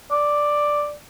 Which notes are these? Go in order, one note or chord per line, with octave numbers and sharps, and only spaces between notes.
D5